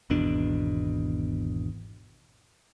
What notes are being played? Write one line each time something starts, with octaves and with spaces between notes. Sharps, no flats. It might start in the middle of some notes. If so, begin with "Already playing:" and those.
G#1 E2 B2 D4